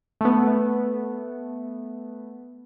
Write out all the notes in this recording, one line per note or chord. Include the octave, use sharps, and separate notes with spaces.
A3 B3